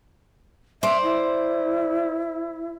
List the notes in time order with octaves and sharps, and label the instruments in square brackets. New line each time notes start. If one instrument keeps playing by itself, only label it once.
[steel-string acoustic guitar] C5 D5 [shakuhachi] E5
[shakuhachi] E4